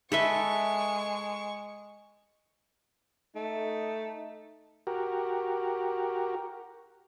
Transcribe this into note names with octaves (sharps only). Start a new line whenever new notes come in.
G#3 A4 B4 E5 C#6
A3 D#4
F#4 G4 A#4